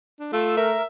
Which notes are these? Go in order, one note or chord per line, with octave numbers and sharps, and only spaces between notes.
D4
A3 F4 E6
A#4 E5